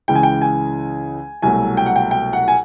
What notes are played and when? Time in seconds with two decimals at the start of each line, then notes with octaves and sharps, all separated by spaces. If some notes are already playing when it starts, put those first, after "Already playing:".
0.08 C#2 C#3 E3 G5
0.15 G#5
0.23 G5
0.41 G#5
1.42 C2 B2 F#3 A3 G#5
1.77 G5
1.86 F#5
1.96 G5
2.11 G5
2.33 F#5
2.48 G#5